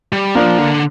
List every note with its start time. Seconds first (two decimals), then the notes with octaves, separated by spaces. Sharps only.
0.13 G3
0.35 F3 A#3 D4
0.59 D3